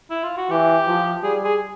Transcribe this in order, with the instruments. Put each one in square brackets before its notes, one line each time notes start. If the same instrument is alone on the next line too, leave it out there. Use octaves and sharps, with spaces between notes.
[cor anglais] E4
F4
F#4
[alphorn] E3 [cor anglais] G4
[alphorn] F3
[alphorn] G3 [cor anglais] G#4
[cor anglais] G#4